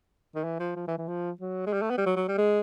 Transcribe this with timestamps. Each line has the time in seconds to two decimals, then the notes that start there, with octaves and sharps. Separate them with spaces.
0.35 D#3
0.44 E3
0.60 F3
0.76 F3
0.88 E3
0.98 E3
1.08 F3
1.41 F#3
1.67 G#3
1.73 G3
1.82 A3
1.90 B3
1.98 G3
2.06 F#3
2.16 F#3
2.28 G3
2.38 G#3